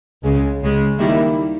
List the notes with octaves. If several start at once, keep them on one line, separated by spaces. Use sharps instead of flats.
C#2 C#3 G#3
C#2 C#3 G#3
D#3 G3 A#3 E4